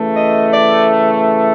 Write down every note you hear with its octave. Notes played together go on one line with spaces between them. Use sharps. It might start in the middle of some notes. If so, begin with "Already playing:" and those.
Already playing: C#3 E3 A3
D#5
D5